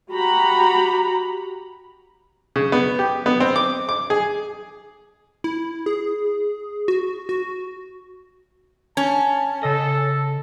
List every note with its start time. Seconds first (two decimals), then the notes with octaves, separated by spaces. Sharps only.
0.12 F#4 G4 A#5 B5
2.56 C#3
2.72 B3
2.99 G4
3.26 B3
3.40 C4
3.56 D6
3.89 D6
4.10 G#4
5.44 E4
5.86 G#4
6.88 F#4
7.29 F#4
8.97 C#4 A5
9.63 C#3 A4 D#5